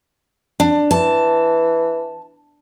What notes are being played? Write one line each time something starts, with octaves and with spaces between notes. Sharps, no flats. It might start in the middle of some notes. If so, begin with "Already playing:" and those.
D4
E3 A5